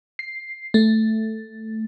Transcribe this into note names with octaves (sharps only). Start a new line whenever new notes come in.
C7
A3